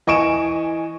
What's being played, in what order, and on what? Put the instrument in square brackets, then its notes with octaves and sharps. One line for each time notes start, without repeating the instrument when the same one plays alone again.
[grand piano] E3 D#5 G#5 C#6 D7 E7